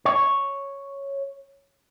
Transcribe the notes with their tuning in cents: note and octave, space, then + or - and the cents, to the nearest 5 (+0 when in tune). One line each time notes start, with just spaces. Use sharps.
C#5 +0